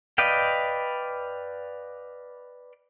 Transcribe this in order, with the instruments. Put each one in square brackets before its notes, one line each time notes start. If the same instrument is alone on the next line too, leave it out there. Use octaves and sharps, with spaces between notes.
[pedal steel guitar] B4 D5 D#5 F5 G5